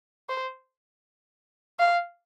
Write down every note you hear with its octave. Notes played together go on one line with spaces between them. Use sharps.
C5
F5